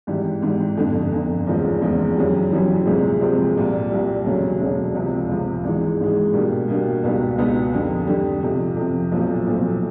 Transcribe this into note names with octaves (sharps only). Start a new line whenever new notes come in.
G#1 G#2 E3 G3
G#1 G#2 E3 G3
G1 F2 D3
G1 F2 D3
F1 E2 C#3 F3 G#3
F1 E2 C#3 F3 G#3
F#2 C#3 E3 G3
F#2 C#3 E3 G3
D2 C3 F3 G#3 C4
D2 C3 F3 G#3 C4
C2 A#2 G3
C2 A#2 G3
E1 D2 C#3 F#3
E1 D2 C#3 F#3
C#2 C3 F3
C#2 C3 F3
G#1 G#2 E3 G#3
G#1 G#2 E3 G#3
B2 G3 A#3 D4
B2 G3 A#3 D4
C#2 B2 G3 B3 D#4
C#2 B2 G3 B3 D#4
F2 D3 G3
F2 D3 G3
F2 C3 F3
F2 C3 F3
B1 A#2 F3 A3 C4
B1 A#2 F3 A3 C4